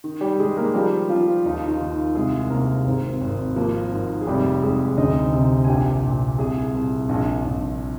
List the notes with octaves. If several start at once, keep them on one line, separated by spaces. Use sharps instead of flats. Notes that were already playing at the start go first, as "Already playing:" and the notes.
D#3
G3 G4
D#3 G#3 G#4
A#3 A#4
F3 G3 G4
F3 F4
D#2 D#4
F4
D#3 D#4
D#2
C2 G#3 G#4
C3 A#3 A#4
G#1 C4
G#1
F3 A#3
G#2
G#4
F1 G3 G4
F1 G#3 G#4
D2 D#4 D#5
C3
G#5
A#1 G4 G5
A#2
C2 G#4 G#5
C2
A#1
A#1